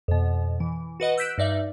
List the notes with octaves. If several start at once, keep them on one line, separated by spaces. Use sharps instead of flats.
F2 B2
E3
F#4 B4 D#5 F#5
E6 F#6 G6 B6 D7 E7
G2 D#4 D5 E5